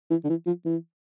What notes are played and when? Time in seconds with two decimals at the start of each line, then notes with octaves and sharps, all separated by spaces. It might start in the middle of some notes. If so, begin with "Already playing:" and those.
0.11 E3
0.24 D3
0.29 E3
0.47 F3
0.65 E3